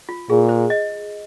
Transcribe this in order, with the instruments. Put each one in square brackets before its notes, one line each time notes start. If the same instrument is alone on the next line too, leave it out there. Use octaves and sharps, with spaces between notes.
[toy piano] F4
[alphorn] A#2 [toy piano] G#4
[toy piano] C5
D#5